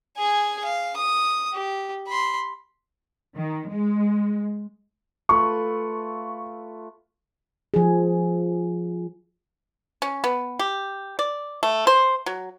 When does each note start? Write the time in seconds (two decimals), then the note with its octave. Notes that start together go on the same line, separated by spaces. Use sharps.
0.17 G#4 G#5
0.65 F5
0.96 D#6
1.53 G4
2.08 B5 C6
3.36 D#3
3.70 G#3
5.29 A3 F4 B4 C#6
7.74 F3 G#4
10.02 C#4
10.24 B3
10.59 G4
11.19 D5
11.63 A3
11.87 C5
12.26 F#3